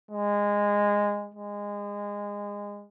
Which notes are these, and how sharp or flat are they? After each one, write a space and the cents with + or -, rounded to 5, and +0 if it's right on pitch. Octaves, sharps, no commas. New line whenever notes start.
G#3 -15
G#3 -25